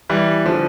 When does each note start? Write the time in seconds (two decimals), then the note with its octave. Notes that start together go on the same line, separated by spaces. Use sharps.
0.10 E3 G3
0.46 D3 F3